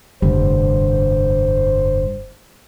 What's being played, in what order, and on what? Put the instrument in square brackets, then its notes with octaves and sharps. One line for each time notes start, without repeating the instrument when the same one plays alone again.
[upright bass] F1 [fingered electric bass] G2 D3 G3 [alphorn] C5